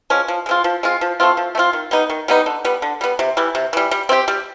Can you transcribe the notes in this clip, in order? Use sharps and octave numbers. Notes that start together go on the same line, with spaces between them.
F3 G#3 C#4
F3
G#3 C4 F4
F3
G#3 C4 F4
F3
A3 C4 F4
F3
A3
C4 F4
D#3
G3 B3 D#4
D#3
G3 B3 D#4
D3
G3 B3
D3
G3 B3
C3
E3 G3
C3
E3 G3
G3
C4 E4 G4
G3